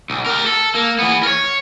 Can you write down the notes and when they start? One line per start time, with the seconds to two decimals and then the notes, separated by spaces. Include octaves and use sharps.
0.10 B1
0.26 G4 A#4
0.46 A4
0.75 A#3
0.99 E3 B3
1.23 A#4 C#5